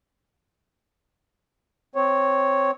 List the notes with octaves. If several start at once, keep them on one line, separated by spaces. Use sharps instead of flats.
C4 C#5